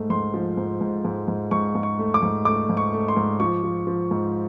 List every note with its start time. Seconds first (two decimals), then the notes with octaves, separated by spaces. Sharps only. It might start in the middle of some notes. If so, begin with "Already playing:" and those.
Already playing: G#2 A3
0.10 G#2 C6
0.34 F3
0.57 G#2
0.81 G#2
1.05 G#2
1.28 G#2
1.51 G#2 C#6
1.75 G#2
1.83 C#6
1.99 A3
2.14 D6
2.23 G#2
2.45 A3 D6
2.69 G#2
2.77 C#6
2.93 A3
3.08 C6
3.17 G#2
3.40 F3 C#6
3.63 F3
3.87 F3
4.11 G#2